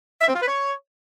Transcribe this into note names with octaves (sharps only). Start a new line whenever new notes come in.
E5
C4
F4
B4
C#5